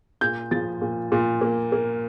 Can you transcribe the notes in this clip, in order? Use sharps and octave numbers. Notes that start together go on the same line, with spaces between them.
A#2 G6
F3 A6
A#2
A#2
A#3
A#3